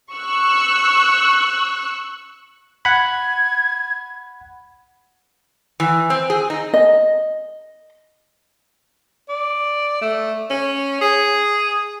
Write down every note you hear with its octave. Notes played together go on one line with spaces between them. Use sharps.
C#6 E6 F#6
F#5 B5 G#6
E3
C4
G#4
D#4
D#5
D5
A3
C#4
G#4